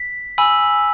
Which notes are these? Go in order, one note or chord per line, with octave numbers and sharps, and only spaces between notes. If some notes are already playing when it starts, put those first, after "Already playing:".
Already playing: B6
G#5 B5 E6